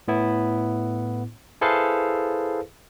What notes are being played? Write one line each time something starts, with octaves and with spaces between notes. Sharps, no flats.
A2 B3 E4
E4 G#4 A4 B4 C5 F5